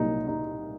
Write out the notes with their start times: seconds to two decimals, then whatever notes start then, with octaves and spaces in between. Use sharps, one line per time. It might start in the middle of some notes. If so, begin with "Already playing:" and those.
Already playing: C2 A#2 F#3 D#4
0.28 D#4